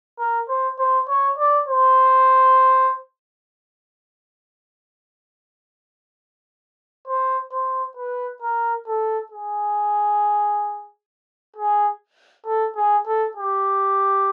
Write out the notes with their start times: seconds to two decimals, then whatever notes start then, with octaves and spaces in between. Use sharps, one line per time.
0.19 A#4
0.49 C5
0.79 C5
1.08 C#5
1.38 D5
1.68 C5
7.08 C5
7.52 C5
7.97 B4
8.42 A#4
8.88 A4
9.32 G#4
11.56 G#4
12.46 A4
12.76 G#4
13.06 A4
13.37 G4